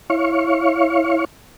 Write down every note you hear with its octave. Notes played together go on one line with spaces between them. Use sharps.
E4 C#5 F5 C#6